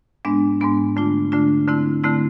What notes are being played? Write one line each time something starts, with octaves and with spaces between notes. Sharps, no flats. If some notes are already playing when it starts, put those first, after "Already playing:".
G#2 G#3 B3 D4
G#2 G#3 B3 D4
D3 A3 D4 F4
D3 A3 D4 F4
D3 A3 C4 E4
D3 A3 C4 E4